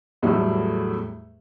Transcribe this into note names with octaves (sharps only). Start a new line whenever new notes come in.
E2 A2 F#3 G3 A3